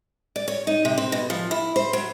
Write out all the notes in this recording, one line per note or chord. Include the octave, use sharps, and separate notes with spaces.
D5
C#5
D#4
C3
C4
B2
F3
E4
C5
F#3